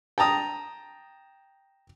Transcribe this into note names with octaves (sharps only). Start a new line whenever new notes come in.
G5 A5 A#5 D#6